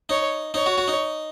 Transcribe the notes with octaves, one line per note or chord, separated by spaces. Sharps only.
D#4 C#5
D#4 C#5
F#4
F#4
D#4